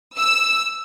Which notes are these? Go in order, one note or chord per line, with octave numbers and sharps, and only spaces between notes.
E6